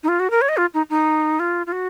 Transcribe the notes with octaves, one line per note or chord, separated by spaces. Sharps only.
D#4
F4
F#4
A#4
C#5
D#5
F4
D#4
D#4
F4
F4
F#4